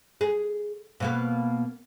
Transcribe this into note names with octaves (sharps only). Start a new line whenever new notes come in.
G#4
B2 A#3 B3